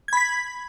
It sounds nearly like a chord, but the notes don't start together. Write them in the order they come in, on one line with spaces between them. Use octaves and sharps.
G#6 B5 B6